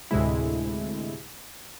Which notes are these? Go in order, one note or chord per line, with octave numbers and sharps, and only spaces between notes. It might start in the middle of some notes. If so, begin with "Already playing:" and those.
D2 A2 C3 G#3 E4